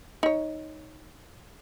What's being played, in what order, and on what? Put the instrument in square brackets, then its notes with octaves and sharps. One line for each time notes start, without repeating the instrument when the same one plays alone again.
[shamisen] D#4 C#5